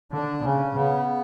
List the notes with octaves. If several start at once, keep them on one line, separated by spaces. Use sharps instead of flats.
D3 D4
B3
C#3 C#4
C#3 B3